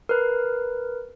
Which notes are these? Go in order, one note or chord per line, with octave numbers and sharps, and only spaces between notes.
A#4 B4